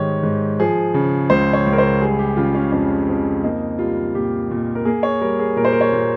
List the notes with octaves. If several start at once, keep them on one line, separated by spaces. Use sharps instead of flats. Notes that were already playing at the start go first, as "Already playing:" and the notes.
Already playing: G#2 D#3 G3 C#5
G#2
F3 G#4
C#3
C#2 C5
C#5
C#2
A#4
C5
G3 G#4
G4
C#3 F4
C#4
F2 C#4
F2
A#3 D#4
G3 F4
A#2 G4
A#2
A#4
A#3 G#4
C#5
G3 A#4
G#4
A#2 A#4
C5
A#4
C#5
A#2